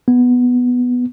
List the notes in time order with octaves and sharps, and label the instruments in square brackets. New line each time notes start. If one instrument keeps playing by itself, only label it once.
[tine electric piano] B3